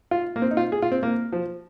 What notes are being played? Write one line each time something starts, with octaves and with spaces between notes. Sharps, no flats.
F4
A#3
C4
D#4
F4
G#4
F4
C4
A#3
F3